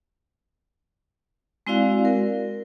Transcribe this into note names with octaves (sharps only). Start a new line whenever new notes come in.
G#3 C4 E4 F#4 D5 F5
A#4